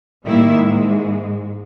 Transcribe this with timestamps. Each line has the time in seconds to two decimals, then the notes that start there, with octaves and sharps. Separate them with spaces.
0.25 A2 D#3 G3 A#3 E4 E5
0.59 G#2 G#3